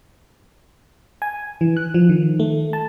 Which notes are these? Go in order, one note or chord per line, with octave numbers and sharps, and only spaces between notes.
G#5
E3
F#6
F3
D#3
A3
A5